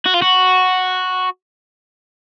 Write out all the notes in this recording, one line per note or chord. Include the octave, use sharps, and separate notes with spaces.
F#4
F4
F#4